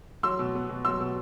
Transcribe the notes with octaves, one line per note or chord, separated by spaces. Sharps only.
F#3 C6 E6
B2
B3
B2
F#3 C6 E6
B2